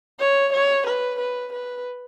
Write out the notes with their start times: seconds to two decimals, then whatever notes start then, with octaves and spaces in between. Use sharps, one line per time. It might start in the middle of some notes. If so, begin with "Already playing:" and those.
0.20 C#5
0.53 C#5
0.86 B4
1.19 B4
1.52 B4